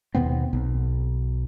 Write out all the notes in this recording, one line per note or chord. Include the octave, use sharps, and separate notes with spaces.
D#2 B2 B3 C4
B1